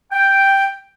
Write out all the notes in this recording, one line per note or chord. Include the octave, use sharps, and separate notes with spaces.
G5